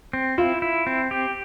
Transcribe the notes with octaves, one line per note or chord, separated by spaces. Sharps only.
C4
E4 F4
E4
C4
G4